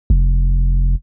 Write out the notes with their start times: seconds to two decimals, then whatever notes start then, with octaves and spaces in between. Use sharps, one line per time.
0.10 F1